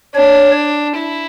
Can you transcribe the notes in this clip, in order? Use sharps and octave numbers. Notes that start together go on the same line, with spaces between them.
D4 C#5
E4